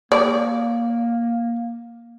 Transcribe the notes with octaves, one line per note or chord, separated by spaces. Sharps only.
A#3 D5